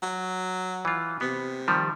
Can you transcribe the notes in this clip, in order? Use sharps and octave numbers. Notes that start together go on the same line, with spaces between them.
F#3
E3 F4
C3 B3
D#3 F3 G3